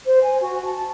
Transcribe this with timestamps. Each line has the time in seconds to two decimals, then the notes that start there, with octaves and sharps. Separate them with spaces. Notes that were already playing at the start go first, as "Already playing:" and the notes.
0.05 C5
0.22 G#5
0.41 F#4
0.64 A5